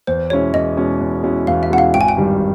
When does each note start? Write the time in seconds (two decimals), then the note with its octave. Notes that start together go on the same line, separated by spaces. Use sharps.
0.07 E2 C5
0.30 B2 G#3 C#4 E4 C#5
0.54 E2 D#5
0.77 B2 G#3 C#4 E4
1.01 E2
1.23 B2 G#3 C#4 E4
1.47 E2 F5
1.63 E5
1.70 B2 G#3 C#4 E4 F#5
1.78 F5
1.94 G#1 G5
2.01 G#5
2.08 G5
2.17 G2 D#3 G3